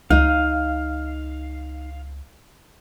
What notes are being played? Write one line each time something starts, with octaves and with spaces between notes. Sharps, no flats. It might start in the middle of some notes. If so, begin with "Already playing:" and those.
C#2 D#4 F5